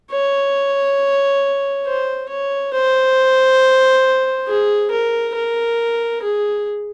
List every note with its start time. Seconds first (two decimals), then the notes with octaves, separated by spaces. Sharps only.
0.11 C#5
1.85 C5
2.29 C#5
2.73 C5
4.47 G#4
4.91 A#4
5.35 A#4
6.22 G#4